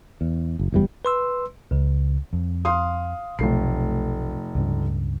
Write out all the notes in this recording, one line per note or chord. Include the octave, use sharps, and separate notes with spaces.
E2
F#1
F#1 E2 G3
B4 C6 E6
C#2 C#3
F2
F5 C6 D#6
F1 B1 A3 C7
C#2 G2 C#3